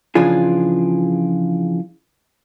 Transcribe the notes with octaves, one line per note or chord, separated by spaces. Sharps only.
C#3 E3 F3 D4 F4 G#4